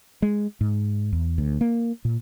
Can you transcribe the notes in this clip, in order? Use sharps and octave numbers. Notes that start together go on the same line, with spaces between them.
G#3
G#2
E2
D2
A#3
A#2